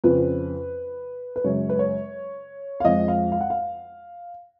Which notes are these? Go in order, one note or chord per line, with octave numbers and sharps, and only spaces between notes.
F2 C#3 F3 B4
B4
F#2 C#3 G#3 C#5
B4
C#5
F5
F2 F3 G#3 D#5
F5
F5
F#5
F5